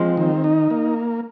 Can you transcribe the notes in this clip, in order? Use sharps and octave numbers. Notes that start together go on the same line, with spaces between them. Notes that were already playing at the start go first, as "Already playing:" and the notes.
Already playing: F3 G#3 C4
D#3
D#4
A#3